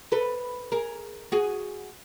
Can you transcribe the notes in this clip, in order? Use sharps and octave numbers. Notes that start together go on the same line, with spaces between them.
A4 B4
G#4 A#4
F#4 G#4